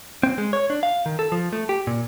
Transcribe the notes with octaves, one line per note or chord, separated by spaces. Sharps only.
C4
G#3
C#5
D4
F5
D#3
A4
F3
A3
G4
A#2